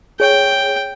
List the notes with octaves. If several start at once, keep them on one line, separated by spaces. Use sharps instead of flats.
G#4 C#5 G5